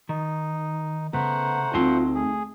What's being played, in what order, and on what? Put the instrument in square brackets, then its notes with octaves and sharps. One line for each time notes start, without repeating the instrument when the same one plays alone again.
[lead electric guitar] D#3 [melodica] D#4
[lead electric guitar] C#3 [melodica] A3 C5 F#5 [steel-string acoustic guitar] B3 [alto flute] A#5
[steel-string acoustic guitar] D2 C4 A5 [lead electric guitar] D#4 C6 [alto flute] F4
[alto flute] A3 [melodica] G#4